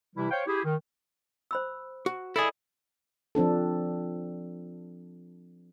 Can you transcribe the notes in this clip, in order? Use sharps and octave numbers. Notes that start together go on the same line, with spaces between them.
C3 E3 G3 E4
C5 C#5 F5 G5
E4 G4 G#4
D#3
C5 B5 E6
F#4
E4 G#4 A4 D5 D#5
F3 C4 D4 A4